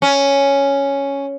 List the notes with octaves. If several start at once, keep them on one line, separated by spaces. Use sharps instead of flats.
C#4